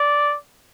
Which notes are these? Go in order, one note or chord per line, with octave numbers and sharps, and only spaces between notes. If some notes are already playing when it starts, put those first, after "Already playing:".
Already playing: D5